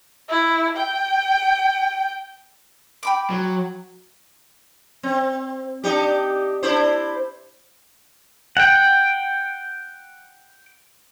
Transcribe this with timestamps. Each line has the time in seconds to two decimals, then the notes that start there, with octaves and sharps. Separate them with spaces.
0.29 E4
0.77 G5
3.03 G5 B5 D6
3.30 F#3
5.03 C4
5.84 D4 D#4 G4
6.63 D4 E4 C5
8.57 F#5 G5